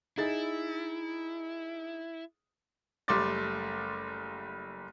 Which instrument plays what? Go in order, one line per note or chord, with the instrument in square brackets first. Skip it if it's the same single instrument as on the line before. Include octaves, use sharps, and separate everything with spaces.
[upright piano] D#4 G#4 A6 [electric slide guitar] E4
[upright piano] F#1 G3 A3 C6 D6 A6